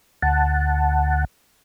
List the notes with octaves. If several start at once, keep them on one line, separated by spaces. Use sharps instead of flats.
D2 F#5 A5